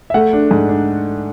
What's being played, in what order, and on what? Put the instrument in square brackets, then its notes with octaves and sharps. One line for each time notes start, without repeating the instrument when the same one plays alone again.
[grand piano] E5
A3 F#5
D4
G#2
D4